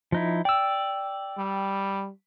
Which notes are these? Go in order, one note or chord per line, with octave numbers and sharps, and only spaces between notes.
F3 D#4 E4
D5 G5 E6
G3